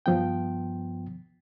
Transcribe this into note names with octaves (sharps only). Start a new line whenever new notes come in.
G2 F3 B3 G5